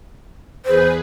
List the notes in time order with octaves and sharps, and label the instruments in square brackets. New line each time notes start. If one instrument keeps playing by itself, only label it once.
[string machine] E2 G#4 B4 [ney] C5